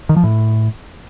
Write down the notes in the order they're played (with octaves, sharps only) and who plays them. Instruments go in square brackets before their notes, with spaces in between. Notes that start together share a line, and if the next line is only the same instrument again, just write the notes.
[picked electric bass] D#3
F3
A2